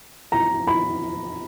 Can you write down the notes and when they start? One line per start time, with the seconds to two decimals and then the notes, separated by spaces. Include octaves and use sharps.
0.32 A#5
0.67 B5